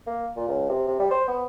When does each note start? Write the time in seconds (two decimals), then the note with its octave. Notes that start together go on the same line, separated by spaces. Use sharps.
0.07 A#3
0.36 A#2
0.49 C#2
0.69 C3
0.87 C3
0.99 G3
1.11 C5
1.28 B3